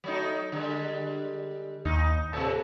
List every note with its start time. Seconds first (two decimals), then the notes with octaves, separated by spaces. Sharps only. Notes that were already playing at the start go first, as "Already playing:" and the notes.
0.04 F#3 A3 D#4
0.52 D3 G3 G#3
1.85 D#2 D#4
2.33 A2 C3 A4